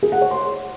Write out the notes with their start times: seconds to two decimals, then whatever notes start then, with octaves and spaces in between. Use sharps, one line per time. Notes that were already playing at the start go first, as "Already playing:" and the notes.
0.03 G#4
0.12 F#5
0.22 C#5
0.31 C6